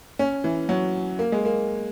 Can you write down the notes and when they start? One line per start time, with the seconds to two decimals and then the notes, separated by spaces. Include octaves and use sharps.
0.19 C#4
0.44 E3
0.69 F#3
1.19 A#3
1.32 G#3
1.45 A#3